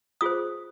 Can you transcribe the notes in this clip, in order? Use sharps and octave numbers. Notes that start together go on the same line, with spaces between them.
F4 G#4 C5 D#6